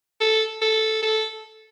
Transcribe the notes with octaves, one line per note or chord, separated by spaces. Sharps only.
A4
A4
A4